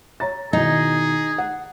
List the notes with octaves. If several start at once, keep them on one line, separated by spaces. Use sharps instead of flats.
C#5 A#5 A6
B2 D#3 D#4 E4 G#4
F#5